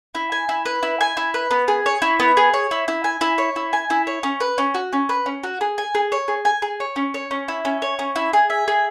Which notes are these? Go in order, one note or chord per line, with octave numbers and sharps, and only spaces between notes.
E4
G#5
E4
B4
E4
G#5
E4
B4
B3
G#4
C#5
E4
B3
G#4
C#5
E4
E4
G#5
E4
C#5
E4
G#5
E4
C#5
C#4
B4
C#4
F#4
C#4
B4
C#4
F#4
G#4
G#5
G#4
C#5
G#4
G#5
G#4
C#5
C#4
C#5
C#4
E4
C#4
C#5
C#4
E4
G#4
E5
G#4